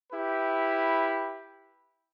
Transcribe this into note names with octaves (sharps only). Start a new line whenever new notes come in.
E4 G4 B4